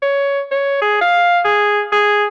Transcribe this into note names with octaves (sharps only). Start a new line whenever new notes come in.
C#5
C#5
G#4
F5
G#4
G#4